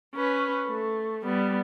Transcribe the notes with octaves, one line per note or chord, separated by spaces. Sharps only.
C#4 B4
A3
G3 B3